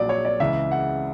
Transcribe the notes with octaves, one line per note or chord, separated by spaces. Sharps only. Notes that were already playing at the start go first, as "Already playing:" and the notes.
Already playing: A#1 A#2 F#3 D5
C#5
D5
C#2 C#3 E3 E5
F#5